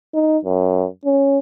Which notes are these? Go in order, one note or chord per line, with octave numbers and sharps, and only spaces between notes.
D#4
F#2
C#4